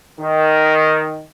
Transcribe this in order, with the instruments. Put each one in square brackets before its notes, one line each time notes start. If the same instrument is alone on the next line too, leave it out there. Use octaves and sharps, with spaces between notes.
[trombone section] D#3